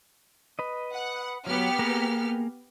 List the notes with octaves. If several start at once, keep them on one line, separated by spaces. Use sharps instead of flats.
B4 D#5
F#5
F#3 B3 G4 F6
A#3 G#4 A#5